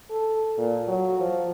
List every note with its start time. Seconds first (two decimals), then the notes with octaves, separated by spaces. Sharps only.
0.10 A4
0.58 A#2
0.88 F#3
1.20 F3